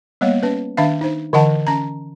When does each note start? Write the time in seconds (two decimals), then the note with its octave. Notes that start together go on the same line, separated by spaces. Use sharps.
0.21 G3 A#3 B3 C#5
0.43 C#4 B4
0.77 D#3 D4 E5 F5
1.01 D#4 C5
1.33 D3 E3 D#5 F#5 A5
1.67 C#4 A#5